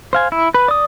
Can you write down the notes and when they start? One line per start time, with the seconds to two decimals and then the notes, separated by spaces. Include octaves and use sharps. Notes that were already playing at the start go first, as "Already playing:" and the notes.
0.13 C5 F5 G#5
0.32 E4
0.54 B4
0.68 D5 D#6